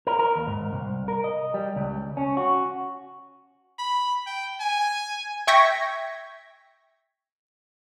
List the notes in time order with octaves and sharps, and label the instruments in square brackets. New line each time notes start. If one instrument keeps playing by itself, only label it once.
[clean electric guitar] A#4
A#4
D#2
G#2
C2
A#4
D#5
G3
C#2
C#4
F#4
[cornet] B5
G5
G#5
[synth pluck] E5 G5 C#6 G#6 A#6 B6